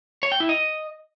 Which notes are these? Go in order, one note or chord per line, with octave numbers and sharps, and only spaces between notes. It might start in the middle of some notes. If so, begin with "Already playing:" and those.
C#5
G5
E4
D#5